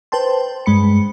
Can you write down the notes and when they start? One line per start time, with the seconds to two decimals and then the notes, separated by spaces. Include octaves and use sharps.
0.12 B4 C5 G5 A5 C6
0.66 G2 G#3 B5 C#7